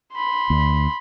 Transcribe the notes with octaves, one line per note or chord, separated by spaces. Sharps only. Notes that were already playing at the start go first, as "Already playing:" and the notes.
B5 C6
D2